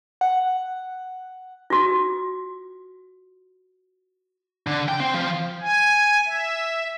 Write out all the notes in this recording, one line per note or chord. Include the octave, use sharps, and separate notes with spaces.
F#5
F4 F#4
D3
G5
C4
F3
G#5
E5